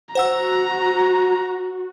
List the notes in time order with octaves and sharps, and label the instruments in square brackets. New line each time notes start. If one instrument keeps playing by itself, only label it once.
[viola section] F#4 [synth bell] C5 F#5 E6 [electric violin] A#5